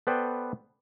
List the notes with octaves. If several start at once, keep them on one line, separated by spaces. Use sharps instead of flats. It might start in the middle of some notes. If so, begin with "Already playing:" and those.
B3 A4 B4 C5 D5 G5